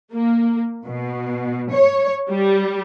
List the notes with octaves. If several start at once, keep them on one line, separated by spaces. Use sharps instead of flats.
A#3
B2
C#5
G3